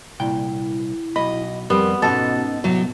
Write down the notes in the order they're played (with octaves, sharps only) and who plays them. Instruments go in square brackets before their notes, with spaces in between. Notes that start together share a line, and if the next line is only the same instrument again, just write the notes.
[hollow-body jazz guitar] C2 A#2 G5 [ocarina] E4
[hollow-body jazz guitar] B1 B5 [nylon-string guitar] D#5
[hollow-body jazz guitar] F2 C4 [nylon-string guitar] G3 [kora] B3 [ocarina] A#4
[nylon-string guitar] G#2 D#4 [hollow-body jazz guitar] B2 [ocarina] C#4 [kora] A4
[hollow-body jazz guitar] C2 [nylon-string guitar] A2 F#3 [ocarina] B3